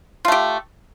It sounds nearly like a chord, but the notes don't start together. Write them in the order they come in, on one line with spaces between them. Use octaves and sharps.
F4 A3 G4